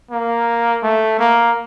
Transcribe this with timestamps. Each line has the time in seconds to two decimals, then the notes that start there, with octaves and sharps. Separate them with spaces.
0.11 A#3
0.83 A3
1.19 A#3